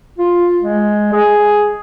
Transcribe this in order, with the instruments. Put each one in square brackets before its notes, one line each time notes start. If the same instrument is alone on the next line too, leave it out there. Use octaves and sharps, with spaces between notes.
[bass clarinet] F4
G#3
G#4